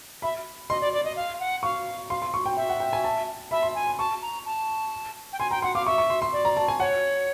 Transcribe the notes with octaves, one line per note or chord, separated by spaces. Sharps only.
E5 B5
D#5 C6
D5
D5
D#5
F5
F#5
F5 C#6
F5 C6
C6
C#6
G5
E5 G5
F#5
G5
G#5
A5
E5 B5
C6
G#5
C6
A5 C#6
A#5
A5
G5
G#5 C6
G5 A#5
F#5 C6
F5 D6
E5 C#6
C#6
C6
C6
D5
A#5
A5
G#5
C#5 F#5